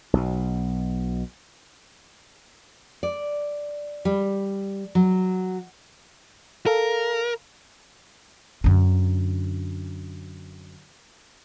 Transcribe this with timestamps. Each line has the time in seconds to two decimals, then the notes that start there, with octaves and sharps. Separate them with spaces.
0.13 B1 B2
3.03 D5
4.05 G3
4.95 F#3
6.66 A4 A#4 F5
8.64 F#2 D3